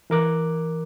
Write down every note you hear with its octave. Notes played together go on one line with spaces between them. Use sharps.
E3 A#4 D6 F#6